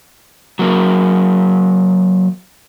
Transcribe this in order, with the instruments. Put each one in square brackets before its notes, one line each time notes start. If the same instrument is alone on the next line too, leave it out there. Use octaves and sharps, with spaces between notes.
[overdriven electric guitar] F#3 A#3